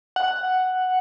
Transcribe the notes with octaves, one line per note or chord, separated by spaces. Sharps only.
F#5